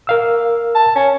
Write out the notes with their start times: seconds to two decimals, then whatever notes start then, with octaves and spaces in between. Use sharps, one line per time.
0.07 A#4 F5 E6
0.75 A5
0.95 C#4